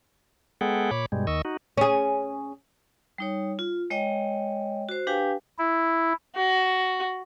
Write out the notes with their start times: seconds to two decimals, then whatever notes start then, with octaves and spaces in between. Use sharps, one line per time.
0.61 G#3 B3 G#4 A4 F#5 G5
0.91 A#2 C#5 B5 D6
1.12 G2 B2 G3 G#3
1.27 D#2 D#3 D#5 C#6 E6
1.45 D#4 F#4
1.77 C#4 G#4
3.18 G3 D#4 C#5
3.59 F4
3.90 G#3 C#5 D#5 G5
4.89 F#4 C5
5.07 D4 G4 B4 F5 G5 G#5
5.58 E4
6.36 F#4